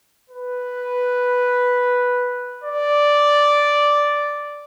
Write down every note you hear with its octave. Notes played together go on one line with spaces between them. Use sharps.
B4
D5